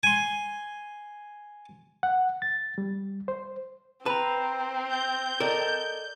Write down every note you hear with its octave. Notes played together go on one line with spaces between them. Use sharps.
G#5 C6
F#5
A6
G3
C5
C4 B4 A5 A#5
G6
A4 A#4 D5 D#5